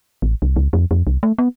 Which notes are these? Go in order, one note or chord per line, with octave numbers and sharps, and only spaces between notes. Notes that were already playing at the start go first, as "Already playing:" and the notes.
A1
C2
C#2
F2
F2
C2
A3
B3